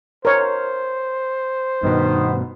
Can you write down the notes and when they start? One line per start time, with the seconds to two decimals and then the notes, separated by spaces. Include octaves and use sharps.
0.25 A#4 C5 C#5
1.83 G2 B2 D#3 B3